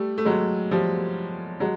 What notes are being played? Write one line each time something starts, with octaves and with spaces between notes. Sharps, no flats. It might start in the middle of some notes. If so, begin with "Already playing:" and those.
Already playing: G3 A3
A3
F#3 G#3
F3 G3
F#3 G#3